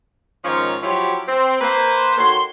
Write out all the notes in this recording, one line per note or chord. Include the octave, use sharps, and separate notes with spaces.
G#2 D#3 F3 C#4 F4 C#5
F3 F#3 E4 F4 G4 C#5
C4
A#3 B4 C5
D#3 F#4 A4 C#5 C6